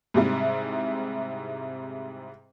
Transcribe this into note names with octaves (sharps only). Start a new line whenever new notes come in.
G#2 C3 G3 E4